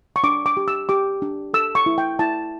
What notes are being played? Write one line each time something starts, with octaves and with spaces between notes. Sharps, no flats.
C#6
D4 D6
D6
G4
E6
G4 D6
D4
A4 E6
C#6
E4
G5
E4 A5